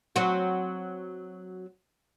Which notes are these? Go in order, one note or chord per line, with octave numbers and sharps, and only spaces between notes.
F#3 C4 F#4